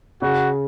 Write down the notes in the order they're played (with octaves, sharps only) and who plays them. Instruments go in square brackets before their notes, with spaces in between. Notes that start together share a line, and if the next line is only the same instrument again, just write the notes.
[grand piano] C#3 [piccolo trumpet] F#4